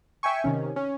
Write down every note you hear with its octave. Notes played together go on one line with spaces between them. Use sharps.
E5 G5 G#5 C#6
C3 D#3 C#4
C#4